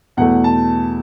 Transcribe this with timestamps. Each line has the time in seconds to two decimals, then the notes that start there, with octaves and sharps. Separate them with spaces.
0.17 E2 B2 A3 F#5
0.44 A5